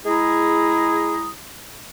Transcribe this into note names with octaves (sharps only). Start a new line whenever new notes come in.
G#3 E4 G#4 A#5 D#6